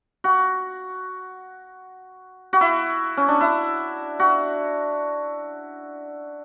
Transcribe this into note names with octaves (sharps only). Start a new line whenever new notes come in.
F#4
F#4
E4
C#4
D4
E4
F#4